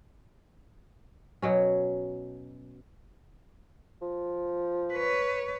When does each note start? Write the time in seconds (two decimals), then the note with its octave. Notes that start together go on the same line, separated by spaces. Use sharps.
1.42 B2 F#3 C#4
4.02 F3
4.93 B4 C#5